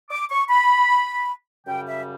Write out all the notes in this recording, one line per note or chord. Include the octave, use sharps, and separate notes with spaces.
D6
C#6
B5
F#2 C#3 G3 G5
E5